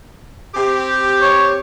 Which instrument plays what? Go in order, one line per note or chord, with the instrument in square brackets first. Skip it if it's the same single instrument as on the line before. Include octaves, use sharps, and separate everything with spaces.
[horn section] C4 G4
[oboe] C#5